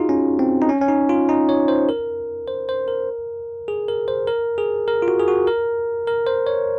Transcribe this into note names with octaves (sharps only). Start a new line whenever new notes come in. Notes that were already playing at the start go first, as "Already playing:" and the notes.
Already playing: D#4 F4 F#4 G#4
C#4
C4
D#4
C#4
C#4
D#4
F4
D#4
C#5
C5
A#4
C5
C5
A#4
G#4
A#4
C5
A#4
G#4
A#4
F4
F#4
G#4
F#4
A#4
A#4
C5
C#5